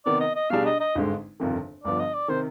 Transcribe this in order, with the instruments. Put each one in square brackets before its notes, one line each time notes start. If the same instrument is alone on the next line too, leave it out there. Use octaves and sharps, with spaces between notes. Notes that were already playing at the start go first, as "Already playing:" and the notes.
[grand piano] C3 D#3 B3 [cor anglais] D5
[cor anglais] D#5
D#5
[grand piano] B2 G3 D4 G#4 [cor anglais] F5
[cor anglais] D#5
D#5
[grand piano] G#1 G2 D3 G#3
G1 F2 C3 D#3
[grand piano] G1 G2 F3 B3 [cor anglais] D5
[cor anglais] D#5
D5
[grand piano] C3 D#3 [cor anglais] C5